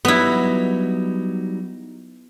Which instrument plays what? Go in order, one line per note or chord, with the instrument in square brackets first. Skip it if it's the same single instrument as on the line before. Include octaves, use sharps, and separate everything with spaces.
[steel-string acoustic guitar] F#3 G3 D#4 [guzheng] B3 E4